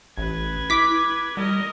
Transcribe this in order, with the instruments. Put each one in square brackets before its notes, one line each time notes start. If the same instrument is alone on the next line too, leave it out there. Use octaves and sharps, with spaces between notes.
[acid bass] A1 [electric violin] B4 G#6
[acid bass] E4 [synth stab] D6 B6
[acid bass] G3 [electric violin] A#4 D#5